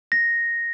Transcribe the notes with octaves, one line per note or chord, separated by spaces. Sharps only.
A#6